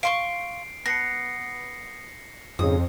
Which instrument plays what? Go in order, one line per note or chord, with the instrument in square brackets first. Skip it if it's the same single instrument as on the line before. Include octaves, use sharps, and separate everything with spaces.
[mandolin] F5 C6 C#6 [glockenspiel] C7 D7
[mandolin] B3 [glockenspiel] A#6 C7 C#7
[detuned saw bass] F2 [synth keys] G#2 C#3 [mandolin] D#6